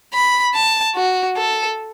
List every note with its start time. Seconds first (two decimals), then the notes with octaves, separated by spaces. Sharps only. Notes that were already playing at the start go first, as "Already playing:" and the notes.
0.14 B5
0.55 A5
0.96 F#4
1.37 A4